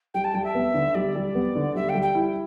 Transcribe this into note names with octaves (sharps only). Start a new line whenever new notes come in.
G3 G5
A5
G3 G5
E5
B3
D3
G3 D5
G3
B3
D3
G3 E5
G5
G3
G5
E4